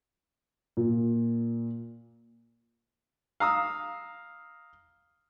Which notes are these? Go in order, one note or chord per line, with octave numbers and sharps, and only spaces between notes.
A#2
F5 A#5 D#6 E6